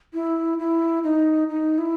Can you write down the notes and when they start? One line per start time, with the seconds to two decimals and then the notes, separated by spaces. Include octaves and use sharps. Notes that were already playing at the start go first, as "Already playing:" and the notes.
0.14 E4
0.59 E4
1.04 D#4
1.49 D#4
1.78 E4